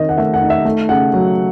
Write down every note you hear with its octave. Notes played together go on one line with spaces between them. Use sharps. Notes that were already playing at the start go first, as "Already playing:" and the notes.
Already playing: D#3 C4 C#4 D#5
F#5
A3 E5
F#5
D#4
E5
A3
C#3 F#5
F#3